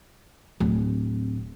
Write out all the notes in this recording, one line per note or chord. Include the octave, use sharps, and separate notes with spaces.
D1 C4